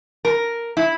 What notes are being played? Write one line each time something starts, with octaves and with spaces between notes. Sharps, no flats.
A#4
E4